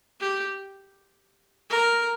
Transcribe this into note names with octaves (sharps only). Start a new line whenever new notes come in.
G4
A#4